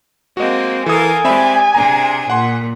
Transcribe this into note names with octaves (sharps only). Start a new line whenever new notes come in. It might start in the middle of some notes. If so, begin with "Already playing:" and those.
G#3 A#3 C4 F#4 D#5
E3 A4 A#4 F5 G#5 D#6
G#3 C4 G4 D5 E5 B5
C3 D4 G#4 A#5
A#2 F#5 C6